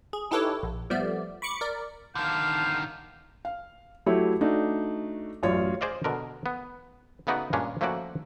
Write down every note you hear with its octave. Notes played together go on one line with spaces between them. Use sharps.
G#4
D#4 E4 G4 A4 B4 C#5
A#1
F3 G3 A3 B3 D5
B5 C#6 D6 C#7
A#4 D5
D3 D#3 F5 A5 D6 G6
F5
F#3 A3 E4 G4 C#5
A3 D4 D#4 F#4
A1 F#2 F4 C#5 D5
G#4 C5 D5 D#5 F5
B2 D3 A#4
B3
C#3 A3 B3 D#4 F#4 D5
G2 A#2 G#3 C#4 D4
F3 A3 A#3 C#4 F#4 D5